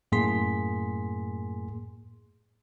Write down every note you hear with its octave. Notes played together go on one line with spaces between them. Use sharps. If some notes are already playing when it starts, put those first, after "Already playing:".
F#2 A2 A#3 G#4 C6 B6